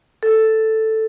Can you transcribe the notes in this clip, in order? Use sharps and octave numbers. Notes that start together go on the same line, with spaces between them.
A4